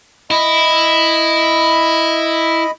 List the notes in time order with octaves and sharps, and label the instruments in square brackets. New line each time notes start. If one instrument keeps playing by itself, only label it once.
[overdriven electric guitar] E4 [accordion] D#5 B5